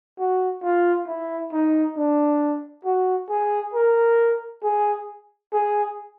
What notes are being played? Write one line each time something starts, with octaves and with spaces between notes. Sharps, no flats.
F#4
F4
E4
D#4
D4
F#4
G#4
A#4
G#4
G#4